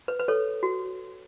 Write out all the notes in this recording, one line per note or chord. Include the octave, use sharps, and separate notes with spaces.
B4
B4
A4 C#5
F#4